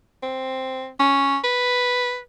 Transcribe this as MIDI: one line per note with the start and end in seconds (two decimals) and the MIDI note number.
0.23 0.90 60
1.00 1.38 61
1.44 2.20 71